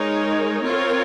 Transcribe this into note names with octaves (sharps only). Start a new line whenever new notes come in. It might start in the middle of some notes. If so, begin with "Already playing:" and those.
Already playing: G#3 D#4 A#4 C#5
C4 F4 A#4 C#5